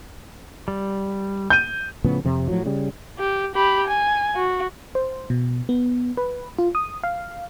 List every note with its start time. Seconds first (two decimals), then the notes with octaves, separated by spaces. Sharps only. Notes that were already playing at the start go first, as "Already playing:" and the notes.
0.68 G3
1.50 G6 D#7
2.04 A2 C#3 F3 B3
2.25 F2 C3
2.48 A2 F3 F#3
2.66 C#3 G3
3.19 G4
3.55 G4 B5
3.87 G#5
4.36 F#4
4.95 C5
5.30 B2
5.69 B3
6.17 B4
6.59 F4
6.75 D#6
7.04 F5